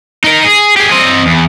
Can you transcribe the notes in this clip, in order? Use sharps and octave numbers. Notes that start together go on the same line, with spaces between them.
D#4 A#4
G#4
G4 G#4
C4 D#5
E2